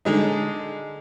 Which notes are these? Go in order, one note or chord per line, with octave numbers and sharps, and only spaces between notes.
D3 G#3 D#4